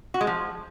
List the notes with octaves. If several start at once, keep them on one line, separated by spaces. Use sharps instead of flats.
F#4
G#3
F3